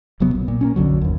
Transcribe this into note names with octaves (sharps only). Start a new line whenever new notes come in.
E1 C3 F#3 B3
A#1
A#2
A#3 C4 C#4
B1 F2 D3 F#3
G1 D#2